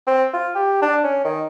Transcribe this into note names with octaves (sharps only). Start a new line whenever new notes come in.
C4
F4
G4
D4
C#4
D#3